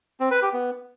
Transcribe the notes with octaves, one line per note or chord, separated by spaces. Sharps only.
C4
B4
G4
B3